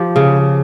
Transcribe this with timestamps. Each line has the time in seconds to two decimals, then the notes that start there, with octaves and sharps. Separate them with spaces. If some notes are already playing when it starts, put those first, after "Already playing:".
Already playing: F3 G4
0.16 C#3